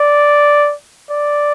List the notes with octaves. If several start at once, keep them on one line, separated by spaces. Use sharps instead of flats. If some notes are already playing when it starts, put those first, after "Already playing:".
Already playing: D5
D5